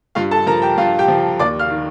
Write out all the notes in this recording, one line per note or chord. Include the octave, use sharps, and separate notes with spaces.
G2 F4 F5
A4 A5
F3 A#4 A#5
G4 G5
G2 F4 F5
G4 G5
F3
D#2 D5 D6
F5 F6
D#3